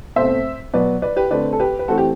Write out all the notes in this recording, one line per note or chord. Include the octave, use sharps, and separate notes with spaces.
B2 A3 C4 C5 E5
B2 F#3 B3 B4 D5
B4 D5
G4 B4
D3 A3 C4 B4 D5
A4
G4 B4
B4
E3 A3 C4 F#4 A4
G4